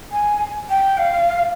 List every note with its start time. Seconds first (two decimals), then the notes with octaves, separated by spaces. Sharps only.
0.12 G#5
0.69 G5
0.98 F5